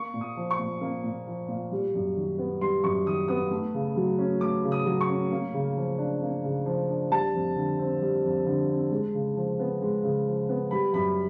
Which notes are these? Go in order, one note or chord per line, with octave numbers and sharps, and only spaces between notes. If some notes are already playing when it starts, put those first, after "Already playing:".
Already playing: A#3 C#6
A#2
D#6
F3
C#6
A#2
A#3
A#2
F3
A#2
G3
F#2
D#3
B3
G3 C6
F#2 C#6
D#3 D#6
B3 D#6
A3
C#3
F#3
C#4
A3 D6
C#3
D#6
F#3
C#6
C#4
A#3
C#3
F3
D4
A#3
C#3
F3
D4
G3 A5
F2
D3
C4
G3
F2
D3
C4
G#3
C#3
F3
B3
G#3
C#3
F3
B3
G3 B5
F#2 B5